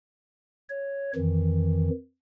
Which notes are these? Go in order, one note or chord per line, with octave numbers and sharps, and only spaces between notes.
C#5
F2 D#3 E3